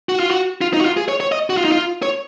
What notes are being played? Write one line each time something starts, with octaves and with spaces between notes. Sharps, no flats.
F#4
F4
F#4
F4
D#4
F#4
F4
G#4
C#5
C#5
D#5
F#4
F4
D#4
F4
C#5